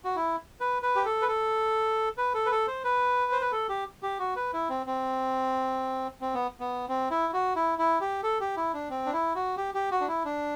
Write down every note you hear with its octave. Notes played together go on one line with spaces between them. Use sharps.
F#4
E4
B4
B4
G4
A4
B4
A4
B4
A4
B4
A4
C5
B4
C5
B4
A4
G4
G4
F#4
B4
E4
C4
C4
C4
B3
B3
C4
E4
F#4
E4
E4
G4
A4
G4
E4
D4
C4
D4
E4
F#4
G4
G4
F#4
D4
E4
D4